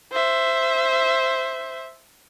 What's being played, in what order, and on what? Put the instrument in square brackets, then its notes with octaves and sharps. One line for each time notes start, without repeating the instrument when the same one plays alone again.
[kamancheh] C5 E5